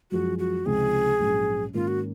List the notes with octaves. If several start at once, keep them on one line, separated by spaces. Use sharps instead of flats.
F#2 F3 G#3 F#4
F#4
C#2 C3 F3 C4 D#4 G#4
A#1 G#2 F#3 C#4
G#2 D#3 A#3 C#4 F4
F#4